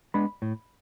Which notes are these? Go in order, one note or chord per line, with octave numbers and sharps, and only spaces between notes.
G#3 B3 D4 B5
A2